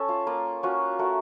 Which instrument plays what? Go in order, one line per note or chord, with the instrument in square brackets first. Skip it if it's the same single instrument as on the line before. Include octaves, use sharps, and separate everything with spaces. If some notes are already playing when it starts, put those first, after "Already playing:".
Already playing: [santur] C#4 A4 C#5
F4
A#3 F4
C#4 F4 F#4
A3 F#4 A#4